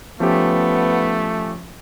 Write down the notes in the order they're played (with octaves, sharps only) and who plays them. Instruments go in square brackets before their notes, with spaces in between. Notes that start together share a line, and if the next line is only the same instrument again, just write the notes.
[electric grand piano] F3 C#4 G4 [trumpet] A3 [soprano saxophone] B3